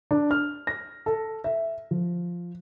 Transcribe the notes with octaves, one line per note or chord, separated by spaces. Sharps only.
D4
F6
A#6
A4
E5
F3